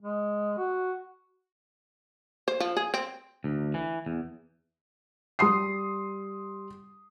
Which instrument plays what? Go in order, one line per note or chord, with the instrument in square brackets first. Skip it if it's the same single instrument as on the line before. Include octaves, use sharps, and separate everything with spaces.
[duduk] G#3
F#4
[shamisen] C5
F3
G#4
C4
[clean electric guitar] D2
E3
E2
[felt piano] G3 C6 D#6 C7